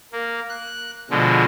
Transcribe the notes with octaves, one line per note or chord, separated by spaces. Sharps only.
A#3
F#6
B2 D3 F3 G#3